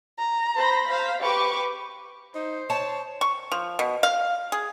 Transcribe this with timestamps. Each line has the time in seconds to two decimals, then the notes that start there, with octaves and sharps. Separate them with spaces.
0.19 A#5
0.57 C5 B5 A#6
0.91 C5 F5 B6
1.22 G4 B4 C#6 D6
2.35 D#4 C5
2.70 C#5 A5
3.21 C#6
3.52 F3
3.79 B2
4.03 F5
4.52 G#4